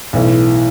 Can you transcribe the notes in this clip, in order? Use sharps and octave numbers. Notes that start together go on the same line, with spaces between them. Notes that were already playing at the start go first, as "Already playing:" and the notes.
B1 A2 E3